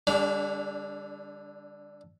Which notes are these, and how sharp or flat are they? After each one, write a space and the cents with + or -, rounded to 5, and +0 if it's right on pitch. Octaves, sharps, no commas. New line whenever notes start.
D3 +0 G3 +35 D4 -35